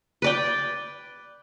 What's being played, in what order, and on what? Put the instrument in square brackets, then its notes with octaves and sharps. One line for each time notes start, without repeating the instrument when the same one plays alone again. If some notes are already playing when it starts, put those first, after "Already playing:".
[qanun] B4 D5 G5